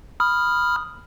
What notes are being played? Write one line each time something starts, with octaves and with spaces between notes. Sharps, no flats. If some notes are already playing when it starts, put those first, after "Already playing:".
B5 D#6 F6